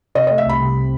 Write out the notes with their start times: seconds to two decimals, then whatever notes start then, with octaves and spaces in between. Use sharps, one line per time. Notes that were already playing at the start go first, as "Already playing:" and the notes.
0.15 C3 D#5
0.27 A3 D#5
0.38 E5
0.46 C2 B5
0.61 C3
0.77 C3